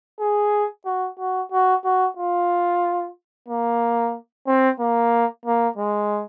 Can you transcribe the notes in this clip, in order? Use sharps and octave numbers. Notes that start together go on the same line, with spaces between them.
G#4
F#4
F#4
F#4
F#4
F4
A#3
C4
A#3
A#3
G#3